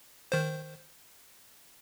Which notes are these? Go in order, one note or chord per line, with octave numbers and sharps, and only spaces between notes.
D#3 C5